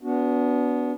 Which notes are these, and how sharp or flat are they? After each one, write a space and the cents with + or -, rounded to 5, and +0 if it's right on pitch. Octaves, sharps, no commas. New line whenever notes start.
B3 +0 D4 -30 F#4 +0